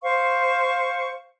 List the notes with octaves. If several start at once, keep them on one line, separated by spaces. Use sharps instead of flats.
C5 F5 C#6